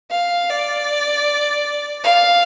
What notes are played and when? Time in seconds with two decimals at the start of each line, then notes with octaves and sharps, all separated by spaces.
0.11 F5
0.50 D5
2.04 F5